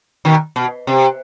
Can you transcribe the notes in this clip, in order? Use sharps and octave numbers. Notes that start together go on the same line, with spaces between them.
B2 D#3
B2
C3